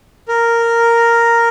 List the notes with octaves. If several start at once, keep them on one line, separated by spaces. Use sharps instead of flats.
A#4